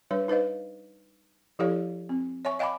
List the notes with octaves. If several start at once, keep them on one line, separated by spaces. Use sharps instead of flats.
G3 D4 B4 C#5
D#4 B4 C5 D#5 F5
F3 E4 G4 A4 C#5 F5
C4
C#5 E5 G#5 C#6
D#5 F5 G5 G#5 B5 D6